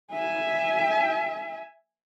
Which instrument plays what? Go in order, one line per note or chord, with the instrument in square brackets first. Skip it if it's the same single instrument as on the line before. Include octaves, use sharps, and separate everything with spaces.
[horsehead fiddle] E5 G#5